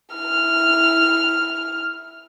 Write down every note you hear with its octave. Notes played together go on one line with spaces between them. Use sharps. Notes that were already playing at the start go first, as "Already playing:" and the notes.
E4 F6